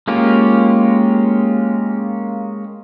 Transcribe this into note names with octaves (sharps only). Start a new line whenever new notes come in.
G#3 A#3 C#4 F4 G4